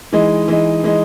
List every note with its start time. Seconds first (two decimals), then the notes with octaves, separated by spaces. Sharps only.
0.13 E3 G#3 D#4
0.48 E3 G#3 D#4
0.84 E3 G#3 D#4